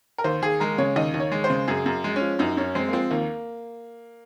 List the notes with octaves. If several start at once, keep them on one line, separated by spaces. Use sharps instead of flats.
A#4
D#2 C5
D#2 G#4
G#3 A#4
C#3 C#5
D#2 D#5
D#2
C#5
G#3
C5
C#3
F#2 G#4
F#2
G#3
C#4
F3
F#2 D#4
F#2 C#4
G#3 C4
A#3
F3 C4
D#2 A#3